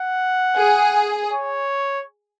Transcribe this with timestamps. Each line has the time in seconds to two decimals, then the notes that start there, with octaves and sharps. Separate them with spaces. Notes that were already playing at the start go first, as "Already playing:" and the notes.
Already playing: F#5
0.56 G#4
1.32 C#5